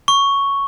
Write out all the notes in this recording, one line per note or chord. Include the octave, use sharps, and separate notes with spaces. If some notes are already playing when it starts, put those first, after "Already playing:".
C#6